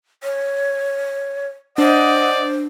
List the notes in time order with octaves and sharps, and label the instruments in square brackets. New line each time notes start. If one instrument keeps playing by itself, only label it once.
[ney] C#5
[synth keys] D4 [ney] C5 [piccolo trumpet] D5 [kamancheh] D#5 F#5